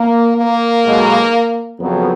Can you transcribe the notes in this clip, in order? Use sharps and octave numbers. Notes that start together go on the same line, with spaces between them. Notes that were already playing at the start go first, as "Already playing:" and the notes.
Already playing: A#3
A#3
B1 B2 G#3
F2 C#3 F#3 B3